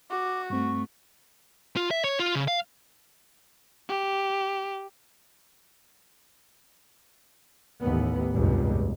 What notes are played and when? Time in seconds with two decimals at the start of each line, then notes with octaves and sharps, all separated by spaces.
0.11 F#4 D6
0.50 G2 A3 C4 C#6
1.77 F4
1.91 E5
2.04 C#5
2.20 F4
2.35 C#3
2.48 F5
3.89 G4
7.81 A1 D#2 B3
8.33 F1 C#2 G2 B2